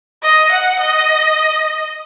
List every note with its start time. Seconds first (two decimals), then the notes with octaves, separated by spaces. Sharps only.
0.23 D#5
0.51 F#5
0.80 D#5